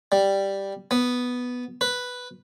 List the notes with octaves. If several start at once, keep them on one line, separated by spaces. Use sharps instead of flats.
G3
B3
B4